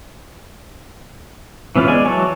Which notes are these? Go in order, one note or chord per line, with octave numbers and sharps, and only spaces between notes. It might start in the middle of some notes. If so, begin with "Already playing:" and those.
E3 B3 C#4 F4
G#3 D5 G#5
E3 F#3 F#4 C#5 A5